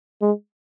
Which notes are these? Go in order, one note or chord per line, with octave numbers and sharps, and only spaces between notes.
G#3